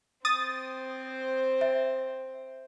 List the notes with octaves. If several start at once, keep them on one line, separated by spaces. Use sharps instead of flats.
C4 C5 D#6 A6
E5